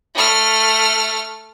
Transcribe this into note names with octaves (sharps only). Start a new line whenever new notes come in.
A3 F6